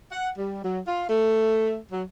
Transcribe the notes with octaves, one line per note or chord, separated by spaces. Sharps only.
F#5
G3
F#3
F4
A3
F#3